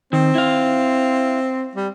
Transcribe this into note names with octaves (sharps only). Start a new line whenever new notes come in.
D#3 C4
E4 F5
G3